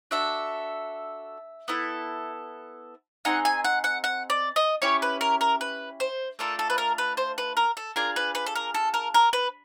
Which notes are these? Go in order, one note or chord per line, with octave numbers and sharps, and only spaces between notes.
D4 F#4 A4 E5
B3 E4 A4
C4 D#4 G#4 F#5
G#5
F#5
F#5
F#5
D5
D#5
C#4 E4 G4 C#5
B4
A#4
A#4
B4
C5
A3 D4 F4 A4 A#4
A4
B4
A#4
B4
C5
B4
A#4
A4
D4 F4 G#4 A#4
B4
B4
A4
A#4
A4
A#4
A#4
B4